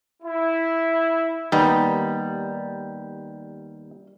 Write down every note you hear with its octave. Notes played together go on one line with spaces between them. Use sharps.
E4
D#2 G3 B3 D#4